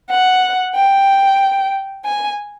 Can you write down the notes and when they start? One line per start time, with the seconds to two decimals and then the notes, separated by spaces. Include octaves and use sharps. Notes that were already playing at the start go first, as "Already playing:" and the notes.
0.10 F#5
0.75 G5
2.05 G#5